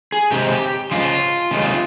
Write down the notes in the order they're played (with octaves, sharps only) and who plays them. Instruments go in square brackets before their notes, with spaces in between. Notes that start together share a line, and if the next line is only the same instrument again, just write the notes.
[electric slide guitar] G#4
C3 D#3 G#3 G4
C#3 F3 G#3 F4
C3 D#3 G#3